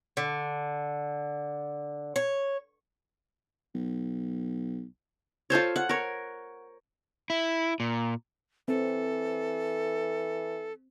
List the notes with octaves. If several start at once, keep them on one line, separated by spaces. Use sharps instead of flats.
D3
C#5
B1
F4 A4 C5 C#5
F#5
A#4 C#5
E4
A#2
E3 C4 A4